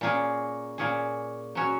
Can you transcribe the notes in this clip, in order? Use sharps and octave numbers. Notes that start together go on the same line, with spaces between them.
A#2 A#3 C#4 G#4
A#2 A#3 C#4 G#4
F#3 C#4 F#4